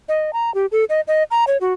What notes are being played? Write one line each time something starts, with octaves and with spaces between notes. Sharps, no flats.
D#5
A#5
G4
A4
D#5
D#5
A#5
C#5
F#4